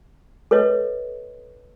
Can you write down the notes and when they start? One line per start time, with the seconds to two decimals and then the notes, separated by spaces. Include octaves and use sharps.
0.51 A4 B4 C#5 D#5